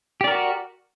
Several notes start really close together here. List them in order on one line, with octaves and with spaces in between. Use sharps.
G4 D5 A#4 F#4